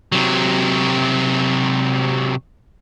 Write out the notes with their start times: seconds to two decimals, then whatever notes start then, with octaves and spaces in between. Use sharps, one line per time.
0.12 C3 F#3